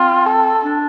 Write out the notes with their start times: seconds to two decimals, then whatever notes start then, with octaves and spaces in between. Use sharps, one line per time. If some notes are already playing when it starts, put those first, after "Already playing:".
Already playing: C4 F4
0.26 A4
0.63 D4